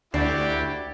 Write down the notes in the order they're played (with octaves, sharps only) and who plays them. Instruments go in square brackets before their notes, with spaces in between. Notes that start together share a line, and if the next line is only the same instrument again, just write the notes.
[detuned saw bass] D2 [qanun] D4 [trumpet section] E4 F#4 G4 [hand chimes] D5 A6 C7